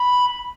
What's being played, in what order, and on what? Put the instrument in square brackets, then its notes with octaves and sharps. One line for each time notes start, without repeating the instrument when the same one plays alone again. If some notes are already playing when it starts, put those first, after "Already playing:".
Already playing: [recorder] B5